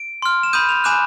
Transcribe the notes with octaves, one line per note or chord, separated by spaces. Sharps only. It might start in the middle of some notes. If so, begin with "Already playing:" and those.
Already playing: D7
C6 F6
E7
B5 D#6 G6 D#7
F7
G#5 B5 D6 F#6 E7